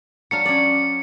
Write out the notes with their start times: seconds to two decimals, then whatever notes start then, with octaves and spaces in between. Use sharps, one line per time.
0.31 F#3 D4 F5 C#7
0.45 C#4 D5